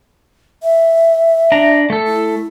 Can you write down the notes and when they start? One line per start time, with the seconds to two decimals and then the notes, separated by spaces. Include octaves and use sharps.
0.63 E5
1.52 D4 A#5
1.90 A3 A4
2.07 E4